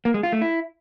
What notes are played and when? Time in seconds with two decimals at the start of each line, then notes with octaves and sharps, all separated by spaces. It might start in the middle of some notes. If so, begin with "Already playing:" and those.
0.05 A#3
0.14 G#3
0.23 F4
0.32 A3
0.42 E4